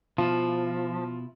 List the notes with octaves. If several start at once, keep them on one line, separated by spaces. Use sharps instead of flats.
B2 F3 E4 F4